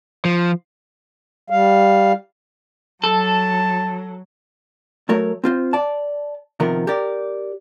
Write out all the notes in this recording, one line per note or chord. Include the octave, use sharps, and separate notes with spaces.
F3
G3 F5
F#3 A4 A5
F#3 A3 A#4 C#5
C4 F4 C5
D5 A5
C3 D#3 F3 B3 F4 A#4
G4 A#4 D5